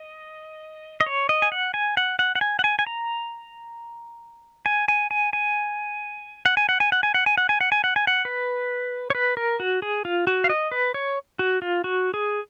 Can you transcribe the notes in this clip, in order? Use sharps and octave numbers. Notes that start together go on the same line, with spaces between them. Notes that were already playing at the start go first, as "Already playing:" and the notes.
Already playing: D#5
D#5
C#5
D#5
G#5
F#5
G#5
F#5
F#5
F#5
G#5
F#5
G#5
G#5
A#5
G#5
G#5
G#5
G#5
F#5
G#5
F#5
G#5
F#5
G#5
F#5
G#5
F#5
G#5
F#5
G#5
F#5
G#5
F#5
B4
C#5
B4
A#4
F#4
G#4
F4
F#4
F5
D#5
B4
C#5
F#4
F4
F#4
G#4